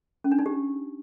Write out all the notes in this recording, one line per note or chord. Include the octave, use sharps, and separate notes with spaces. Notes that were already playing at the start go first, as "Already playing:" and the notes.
C#4
D4
D#4
G4